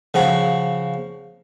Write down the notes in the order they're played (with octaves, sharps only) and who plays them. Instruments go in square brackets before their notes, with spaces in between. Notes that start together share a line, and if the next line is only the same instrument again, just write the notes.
[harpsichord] C#3 F3 F#4